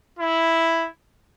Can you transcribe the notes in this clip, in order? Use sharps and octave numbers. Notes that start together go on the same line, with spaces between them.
E4